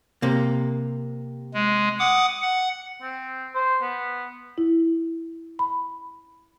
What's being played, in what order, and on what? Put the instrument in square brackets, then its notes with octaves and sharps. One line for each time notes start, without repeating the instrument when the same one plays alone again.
[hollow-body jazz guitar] C3 A#3
[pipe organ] G#3
F#5 D6 D#6
F#5
[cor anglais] C4
C5
B3
[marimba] E4
B5